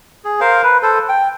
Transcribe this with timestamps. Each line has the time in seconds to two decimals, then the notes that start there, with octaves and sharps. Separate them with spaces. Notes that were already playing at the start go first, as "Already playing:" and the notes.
0.25 G#4
0.41 A#4 C5 F5
0.63 B4
0.83 A4 C5
1.09 G5